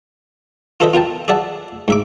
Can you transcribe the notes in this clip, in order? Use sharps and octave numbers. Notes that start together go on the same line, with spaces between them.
F4 A4 B4 C5 D#5 E5
F4 A#4 G5 A5
G#4 D5 E5 F#5 A5
G#2 E5 D6